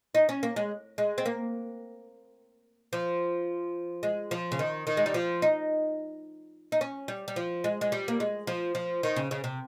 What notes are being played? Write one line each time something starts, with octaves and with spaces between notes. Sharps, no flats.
D#4
C#4
A#3
G#3
G#3
C4
A#3
F3
G#3
F3
C#3
D#3
D#3
G#3
G3
F3
D#4
D#4
C#4
G3
G3
F3
G#3
G#3
G3
A#3
G#3
F3
F3
D#3
C#3
C#3
C3